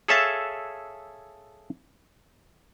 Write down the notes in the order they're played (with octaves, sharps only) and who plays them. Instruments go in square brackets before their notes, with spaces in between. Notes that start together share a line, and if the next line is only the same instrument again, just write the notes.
[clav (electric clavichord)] G#4 A4 C#5 E5 F5 A5